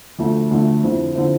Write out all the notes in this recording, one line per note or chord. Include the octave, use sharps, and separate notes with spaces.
D2 D3 F3 A3
D2 D3 F3 A3
F2 D3 F3 C4 E4
D3 F3 C4 E4